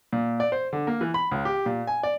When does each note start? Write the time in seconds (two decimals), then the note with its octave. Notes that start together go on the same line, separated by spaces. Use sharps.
0.13 A#2
0.40 D5
0.52 C5
0.73 D3
0.87 A#3
1.01 E3
1.14 B5
1.31 C#2
1.45 G4
1.66 A#2
1.87 G#5
2.03 D5